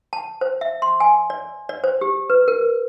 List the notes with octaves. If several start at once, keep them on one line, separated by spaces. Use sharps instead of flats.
A5
C5
E5
C6
G#5
D5
D5
C5
G4
B4
A#4